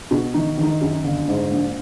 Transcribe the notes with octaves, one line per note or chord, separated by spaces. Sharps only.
B2
D#3 D#4
D#3
D#4
F#2
G1
G#2
A#1